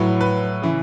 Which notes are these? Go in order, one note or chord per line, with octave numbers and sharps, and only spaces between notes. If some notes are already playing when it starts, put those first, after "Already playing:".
Already playing: A2 F#3 B4
B4
C#3 E3